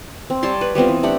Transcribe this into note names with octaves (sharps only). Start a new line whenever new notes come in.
C4
G3 C#5 A5 C6
B4
G3 B3 C4 F4
E3
A3 D4 G4 F#5